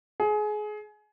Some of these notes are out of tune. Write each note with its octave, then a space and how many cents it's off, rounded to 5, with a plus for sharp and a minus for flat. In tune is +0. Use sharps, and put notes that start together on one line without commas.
G#4 +25